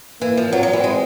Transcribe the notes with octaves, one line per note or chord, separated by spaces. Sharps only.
E3 A#3
F3
F#3 C4
F#3
E3
G#3